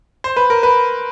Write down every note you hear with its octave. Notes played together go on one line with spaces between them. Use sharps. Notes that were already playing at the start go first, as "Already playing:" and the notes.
C5
B4
A#4
B4